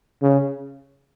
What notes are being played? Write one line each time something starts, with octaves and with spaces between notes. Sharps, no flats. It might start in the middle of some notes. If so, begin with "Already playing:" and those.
C#3